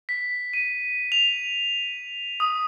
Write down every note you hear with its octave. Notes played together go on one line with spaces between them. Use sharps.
B6
D#7
F7
D#6